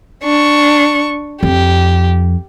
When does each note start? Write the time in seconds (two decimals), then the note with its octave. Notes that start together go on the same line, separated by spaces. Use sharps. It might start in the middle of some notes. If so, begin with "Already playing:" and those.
0.23 D4 C#6
1.43 F2 G4